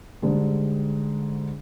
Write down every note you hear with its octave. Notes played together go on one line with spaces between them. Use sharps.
G#2 D3 G3